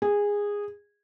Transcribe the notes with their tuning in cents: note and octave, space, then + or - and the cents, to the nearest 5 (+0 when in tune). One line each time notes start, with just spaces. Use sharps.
G#4 -15